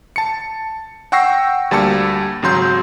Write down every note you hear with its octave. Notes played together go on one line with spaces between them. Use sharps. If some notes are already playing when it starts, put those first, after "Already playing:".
A5 C#7
F#5 G5 C#6 E6 A#6 C7
D2 G3 A#3 A5 E6 C#7
G#1 C#3 F#3 A#5 C6 G6